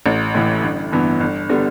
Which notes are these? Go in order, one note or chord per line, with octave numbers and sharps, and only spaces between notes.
A1
A2 E3
G1
G2 E3 B3
G1
D3 G3 B3